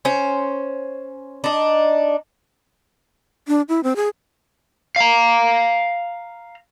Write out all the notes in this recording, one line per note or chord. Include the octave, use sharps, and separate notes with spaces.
C#4 C5
D4 D#4
D4
E4
C4
G#4
F5 A#5